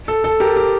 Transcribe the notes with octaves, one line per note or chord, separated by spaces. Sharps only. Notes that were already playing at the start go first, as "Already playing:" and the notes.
A4
A4
G4 A#4
G4